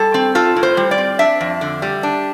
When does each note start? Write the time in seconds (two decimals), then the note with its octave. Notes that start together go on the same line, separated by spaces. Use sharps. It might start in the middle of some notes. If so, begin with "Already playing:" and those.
Already playing: G3 A4
0.14 C4
0.35 F4 A4
0.56 A2
0.63 C5
0.77 G3
0.91 D5
0.98 C4
1.19 D4 E5
1.41 F2
1.61 D3
1.82 G3
2.03 D4